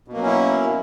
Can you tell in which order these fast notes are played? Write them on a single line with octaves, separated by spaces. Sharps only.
B2 A#3 F#3 C#4 E4